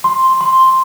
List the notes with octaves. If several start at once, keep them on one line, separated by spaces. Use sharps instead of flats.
C6
C6